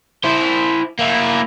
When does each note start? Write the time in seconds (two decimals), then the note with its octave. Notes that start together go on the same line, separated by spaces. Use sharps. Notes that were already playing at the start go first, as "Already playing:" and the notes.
0.24 E4 C5
0.99 A#3 E4